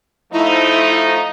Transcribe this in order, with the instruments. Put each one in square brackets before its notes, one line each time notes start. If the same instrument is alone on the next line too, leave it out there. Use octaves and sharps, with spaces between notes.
[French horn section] F3 A3 D#4 [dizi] E4